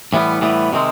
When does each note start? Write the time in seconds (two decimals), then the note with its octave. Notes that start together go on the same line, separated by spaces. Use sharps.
0.13 A2 E3 G3 B3
0.41 A2 E3 G3 B3
0.73 C3 D#3 G#3 C4